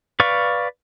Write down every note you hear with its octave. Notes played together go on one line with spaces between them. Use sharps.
B4 D5 F5 C#6